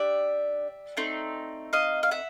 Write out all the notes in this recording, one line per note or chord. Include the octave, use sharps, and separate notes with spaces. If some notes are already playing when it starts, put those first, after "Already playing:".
Already playing: D4 G4 D5 E5
A3 C4 D#4
D#5 F5
F5
E5 F#5